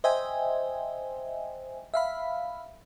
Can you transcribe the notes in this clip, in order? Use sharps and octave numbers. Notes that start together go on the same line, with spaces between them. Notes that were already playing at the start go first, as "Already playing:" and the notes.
C5 D#5 E5 G5 G#5
E5 F5 B5